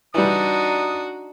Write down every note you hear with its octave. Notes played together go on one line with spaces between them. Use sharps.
E3 G3 D4 D#4 F#4 D#6